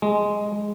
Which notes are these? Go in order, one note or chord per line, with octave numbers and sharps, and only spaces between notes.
G#3